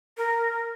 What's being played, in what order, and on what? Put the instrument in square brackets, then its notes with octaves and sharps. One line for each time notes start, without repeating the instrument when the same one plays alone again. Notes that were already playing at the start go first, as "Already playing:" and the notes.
[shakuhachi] A#4